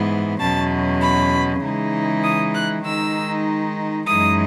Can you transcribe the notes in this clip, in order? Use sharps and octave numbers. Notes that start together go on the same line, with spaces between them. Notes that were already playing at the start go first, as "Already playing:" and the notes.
Already playing: G#2 E3 B3
E2 B2 F#3 C#4 A5
B5
C#3 E3 G#3 D#4
D#6
F#6
D#3 G#3 D#4 E6
F#2 E3 G#3 D#4 D#6